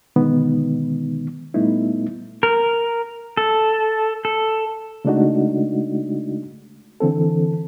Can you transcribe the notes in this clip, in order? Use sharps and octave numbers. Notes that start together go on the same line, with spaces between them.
B2 D3 D#3 G#3 B3 D#4
A#2 G3 A3 B3 D#4 E4
A#4
A4
A4
C#3 G#3 A3 D4 D#4 F#4
D3 E3 C4 A4